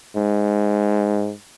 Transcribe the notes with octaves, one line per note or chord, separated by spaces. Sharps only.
G#2